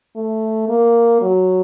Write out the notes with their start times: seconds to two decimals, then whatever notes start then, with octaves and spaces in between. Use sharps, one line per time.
0.16 A3
0.69 A#3
1.21 F#3